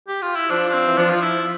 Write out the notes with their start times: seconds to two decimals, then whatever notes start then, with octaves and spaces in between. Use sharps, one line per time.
0.08 G4
0.22 F4
0.36 E4
0.50 F3 D4
0.69 D4
0.73 C4
0.87 E3
0.98 F3 D4
1.10 F4
1.21 E4